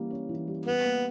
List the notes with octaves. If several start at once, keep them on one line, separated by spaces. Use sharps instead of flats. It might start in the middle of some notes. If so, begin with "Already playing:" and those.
Already playing: E3 G3 A#3 C#4
C#4
E3
G3
G3 B3
A#3